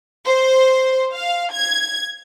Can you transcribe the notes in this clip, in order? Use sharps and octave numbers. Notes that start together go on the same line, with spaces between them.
C5
F5
G#6